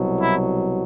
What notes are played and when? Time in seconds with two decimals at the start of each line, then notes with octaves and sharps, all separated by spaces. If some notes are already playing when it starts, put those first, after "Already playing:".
Already playing: C2 B2 F#3
0.21 E4